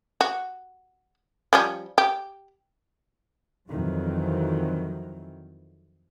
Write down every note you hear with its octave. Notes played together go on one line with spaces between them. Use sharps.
F#4
F3 G3 C#4
G4
F2 D#3 E3 F#3